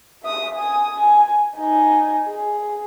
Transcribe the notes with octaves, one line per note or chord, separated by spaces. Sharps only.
E5 D#6
G#5 D#6
G#5
D#4 G#5
G#4